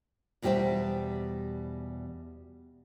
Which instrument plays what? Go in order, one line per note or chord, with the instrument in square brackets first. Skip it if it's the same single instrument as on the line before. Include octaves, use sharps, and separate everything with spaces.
[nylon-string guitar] E2 B2 G3 G4 C5 E5